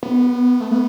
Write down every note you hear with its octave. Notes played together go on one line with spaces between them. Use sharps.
B3
A3
B3